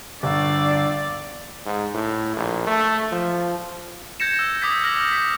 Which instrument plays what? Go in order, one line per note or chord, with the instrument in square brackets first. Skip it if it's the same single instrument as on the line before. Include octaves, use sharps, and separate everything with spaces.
[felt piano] G1 [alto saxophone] D4 [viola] D5 [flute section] F5 C#6 E6
[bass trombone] G#2
A2
A#1
A3
F3
[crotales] G6 G#6 A#6 C#7 E7
E6
D6 D#6 G6 G#6 B6
F6 A#6 F#7
B6